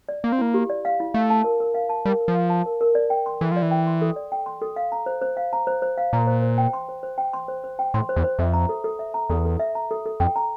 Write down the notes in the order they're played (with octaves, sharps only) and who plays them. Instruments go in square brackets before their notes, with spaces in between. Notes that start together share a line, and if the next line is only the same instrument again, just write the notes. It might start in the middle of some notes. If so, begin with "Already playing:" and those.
[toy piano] D5
[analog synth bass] A#3 [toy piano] F5
[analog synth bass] C4
[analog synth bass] A#3 [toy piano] E4
[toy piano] G4
D5
F5
E4
[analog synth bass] A3 [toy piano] F5
[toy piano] A5
A#4
A#4
F5
A5
[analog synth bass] G3 [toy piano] A#4
[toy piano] A#4
[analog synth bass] F3
[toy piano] F5
A5
A#4
A#4
D5
G5
C6
[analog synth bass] E3 [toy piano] A4
[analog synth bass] F3 [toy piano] D5
[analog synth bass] E3
[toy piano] G5
C6
A4
D5
G5
C6
A4
F5
A#5
C5
C5
F5
A#5
C5
C5
F5
[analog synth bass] A#2 [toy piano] A#5
[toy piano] C5
C5
G5
C6
C5
C5
G5
C6
C5
C5
G5
[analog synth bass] A2 [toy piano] C6
[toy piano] C5
[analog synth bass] E2
[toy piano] C5
[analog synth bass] F2 [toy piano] E5
[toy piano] A#5
A4
A4
E5
A#5
[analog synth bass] E2 [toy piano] A4
[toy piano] A4
E5
A#5
A4
A4
[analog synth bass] F2 [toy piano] G5
[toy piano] A#5